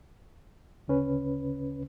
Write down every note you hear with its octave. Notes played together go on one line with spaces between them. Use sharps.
D2 C#3 C#4 B4